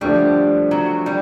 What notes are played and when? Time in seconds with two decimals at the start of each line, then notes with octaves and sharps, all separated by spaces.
0.01 D3 F3 G3 A3 D4 G4
0.71 F#3
1.06 G3